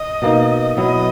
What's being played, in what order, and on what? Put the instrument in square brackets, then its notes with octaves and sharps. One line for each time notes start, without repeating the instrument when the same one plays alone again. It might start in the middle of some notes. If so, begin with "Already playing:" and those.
Already playing: [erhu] D#5
[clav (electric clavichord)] B2 A#3 D#4
[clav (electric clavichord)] B2 F#3 B3 E4 [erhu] D#5